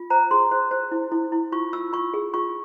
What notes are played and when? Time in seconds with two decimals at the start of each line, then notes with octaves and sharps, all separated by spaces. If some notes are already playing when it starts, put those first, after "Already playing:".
Already playing: F4
0.10 C5 A#5
0.31 G#4 C6
0.51 C5
0.71 C5
0.92 E4
1.12 E4
1.32 E4
1.52 F4 C#6
1.73 F4 E6
1.93 F4 C#6
2.14 G#4
2.34 F4 C#6